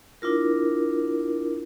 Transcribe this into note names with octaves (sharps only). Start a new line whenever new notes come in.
D4 E4 F4 A#4